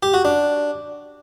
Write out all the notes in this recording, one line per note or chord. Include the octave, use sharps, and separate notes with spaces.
G4
F#4
D4